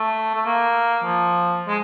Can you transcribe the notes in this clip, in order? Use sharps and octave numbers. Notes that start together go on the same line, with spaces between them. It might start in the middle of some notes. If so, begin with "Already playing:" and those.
Already playing: A3
A3
A#3
F3
G#3